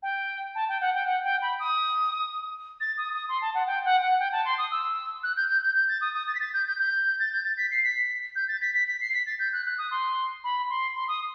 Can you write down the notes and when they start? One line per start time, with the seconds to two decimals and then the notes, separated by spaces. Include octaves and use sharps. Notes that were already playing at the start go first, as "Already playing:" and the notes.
0.02 G5
0.55 A5
0.69 G5
0.81 F#5
0.94 G5
1.07 F#5
1.24 G5
1.42 B5
1.60 D#6
2.80 A6
2.97 D#6
3.15 D#6
3.29 C6
3.41 A5
3.55 F#5
3.67 G5
3.84 F#5
4.02 F#5
4.19 G5
4.32 A5
4.45 C6
4.58 D#6
4.71 E6
5.23 F#6
5.37 G6
5.49 G6
5.62 G6
5.75 G6
5.89 A6
6.01 D#6
6.14 D#6
6.27 A6
6.35 B6
6.40 A6
6.53 G6
6.67 G6
6.80 G6
7.19 A6
7.32 G6
7.44 A6
7.57 B6
7.71 C7
7.83 B6
8.36 G6
8.48 A6
8.61 B6
8.74 B6
8.88 B6
9.01 C7
9.13 B6
9.26 A6
9.39 G6
9.53 F#6
9.66 F#6
9.78 D#6
9.91 C6
10.44 B5
10.69 C6
10.95 C6
11.08 D#6